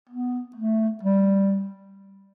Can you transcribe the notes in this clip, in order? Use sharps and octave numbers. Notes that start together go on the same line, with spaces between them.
B3
A3
G3